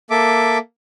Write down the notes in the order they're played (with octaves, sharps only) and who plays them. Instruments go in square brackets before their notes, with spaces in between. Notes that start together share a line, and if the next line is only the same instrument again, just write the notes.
[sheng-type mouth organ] A#3 A4 E5 D6